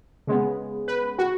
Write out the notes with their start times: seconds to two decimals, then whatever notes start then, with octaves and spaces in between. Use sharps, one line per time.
0.27 C#3 G#3 B3
0.88 B4
1.19 F#4